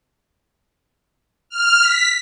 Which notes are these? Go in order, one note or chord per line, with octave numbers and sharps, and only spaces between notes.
F6
B6